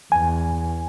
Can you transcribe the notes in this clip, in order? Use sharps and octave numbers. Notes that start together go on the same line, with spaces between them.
E2 G#5